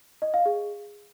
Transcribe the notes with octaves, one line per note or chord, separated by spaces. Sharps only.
D#5
F5
G#4